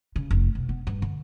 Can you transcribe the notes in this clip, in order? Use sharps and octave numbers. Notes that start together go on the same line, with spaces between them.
C#3
F1
B1
B3
G2
D3